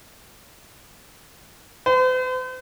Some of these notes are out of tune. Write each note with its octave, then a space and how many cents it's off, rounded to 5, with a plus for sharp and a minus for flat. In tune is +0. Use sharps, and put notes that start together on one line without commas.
C5 -45